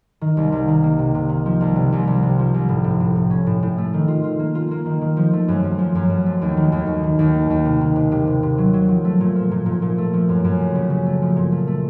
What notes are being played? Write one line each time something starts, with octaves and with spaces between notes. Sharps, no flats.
D#3
C2
C2
D#3
A#3
C3
C3
D#3
F3
C2
C3
C2
C2
C3
F3
C2
A2
A2
A2
A2
C#4
A2
A2
A3
D#3
F4
F4
A#3
F4
A#3
D#3
D#3
F3
A3
F#2
F#2
F3
F#2
F#2
A3
D#2
D#3
D#2
D#2
D#3
D#2
A#3
D#2
C3
D#3
C3
C3
C3
C3
F#3
F#3
F3
A3
A#2
F3
A#2
A#2
A#2
A3
F3
F#2
F#2
C#3
C#3
C#3
A3
F3
A#2
A3
A3